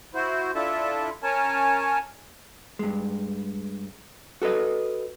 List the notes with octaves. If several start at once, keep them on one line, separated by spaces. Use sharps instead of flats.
E4 F#4 C5
D4 E4 F4 A4 E5 A5
C#4 A#4 C#5 G#5 A5
G2 G#3
F#4 A4 B4 D#5